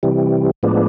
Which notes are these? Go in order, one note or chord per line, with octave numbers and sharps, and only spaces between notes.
C3 E3 G3
A2 F3 G#3 B3 D4